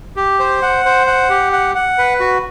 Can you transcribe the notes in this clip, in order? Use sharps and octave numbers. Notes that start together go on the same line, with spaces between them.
G4
C5
F#5
C5
F#5
G4
F#5
F#5
B4
F#4